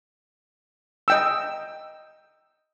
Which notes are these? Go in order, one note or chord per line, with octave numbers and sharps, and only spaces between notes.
D#5 G5 E6